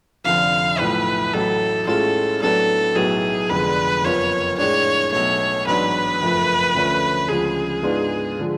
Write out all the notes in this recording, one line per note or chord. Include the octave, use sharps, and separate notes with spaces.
F1 F2 D3 F3 F5
B1 A2 F3 A3 B4
A1 A2 F#3 A4
A2 G#3 C#4 F4 A4
A2 F#3 B3 D4 A4
B1 A2 F#3 B3 F#4 G#4
F1 F2 D3 G#3 B3 B4
F#1 F2 F3 B3 F4 C#5
A2 G#3 D4 C#5
B1 B2 A3 C#5
A1 G#2 F#3 B3 D4 B4
F#1 F2 F3 A3
D2 D3 F3 A3 C#4
D2 C#3 F3 G#3 G#4
G#2 G#3 B3 D4 F4
D3 F3 G#3